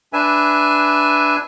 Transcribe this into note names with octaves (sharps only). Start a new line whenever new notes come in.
D4 B4 E5 G#5